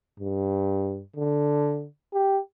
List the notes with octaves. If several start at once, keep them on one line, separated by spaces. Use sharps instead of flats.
G2
D3
G4